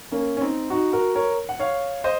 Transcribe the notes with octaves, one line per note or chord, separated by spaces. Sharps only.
A#3 C#4
C#4
C4 D#4
D#4 F#4
F#4 A#4
A#4 C#5
F#5
C#5 F5
C5 D#5